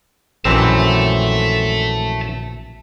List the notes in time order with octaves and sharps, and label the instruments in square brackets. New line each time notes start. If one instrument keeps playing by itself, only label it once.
[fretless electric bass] A#1 [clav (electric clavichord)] F#2 E3 C4 [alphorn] A3 [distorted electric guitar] E5 A5